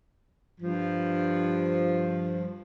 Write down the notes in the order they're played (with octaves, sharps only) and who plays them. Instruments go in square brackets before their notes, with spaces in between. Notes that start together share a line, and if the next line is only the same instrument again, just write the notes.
[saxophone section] G2 F3